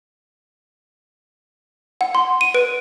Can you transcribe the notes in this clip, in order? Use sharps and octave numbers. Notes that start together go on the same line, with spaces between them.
F#5
C6
D#7
B4 D7